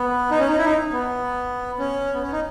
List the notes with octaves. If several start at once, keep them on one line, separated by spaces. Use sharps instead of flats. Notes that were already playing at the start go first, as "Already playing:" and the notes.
Already playing: B3
D#4
C#4
D#4
E4
D#4
B3
C#4
B3
C#4
D#4